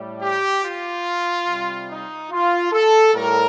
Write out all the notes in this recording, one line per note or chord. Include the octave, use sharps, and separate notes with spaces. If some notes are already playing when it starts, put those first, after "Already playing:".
Already playing: A2 G3
G4
F4
C3 G3
D#4
F4
A4
A2 G3 A#4